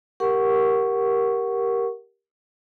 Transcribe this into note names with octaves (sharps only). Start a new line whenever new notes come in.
G4 A#4 F#5 C#6